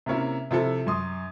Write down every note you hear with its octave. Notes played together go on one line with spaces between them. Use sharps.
C3 A#3 C#4 E4
C3 F3 E4 A4
F#2 C6 D#6